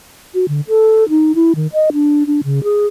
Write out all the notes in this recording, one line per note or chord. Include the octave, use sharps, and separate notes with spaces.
F#4
D3
A4
D#4
E4
D#3
D#5
D4
D4
C#3
G#4